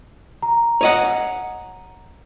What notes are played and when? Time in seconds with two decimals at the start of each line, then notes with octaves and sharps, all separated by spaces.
0.42 A#5
0.81 C#5 D#5 F#5